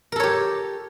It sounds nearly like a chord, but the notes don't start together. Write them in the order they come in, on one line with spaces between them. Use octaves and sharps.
A#4 A4 C#5 G4